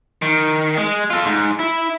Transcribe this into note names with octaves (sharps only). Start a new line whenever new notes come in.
D#3
G#3
F4 A4
G#2
E4